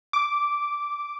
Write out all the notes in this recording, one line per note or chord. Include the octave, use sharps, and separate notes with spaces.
D6